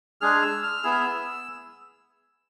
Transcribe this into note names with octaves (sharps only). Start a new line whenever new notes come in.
G#3 D4 G#4 F6
E6
F6
B3 E4 G#4 E6
F6
E6